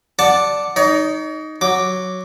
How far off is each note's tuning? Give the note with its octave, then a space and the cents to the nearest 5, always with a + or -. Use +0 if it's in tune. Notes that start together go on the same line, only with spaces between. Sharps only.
D5 +0 F#5 +0 A5 +5
D#4 +0 C#5 +45
F#3 +0 D6 +0